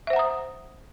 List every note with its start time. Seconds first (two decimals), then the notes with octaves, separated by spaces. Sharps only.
0.07 E5
0.10 C5
0.13 F#5
0.16 A#5
0.19 D#6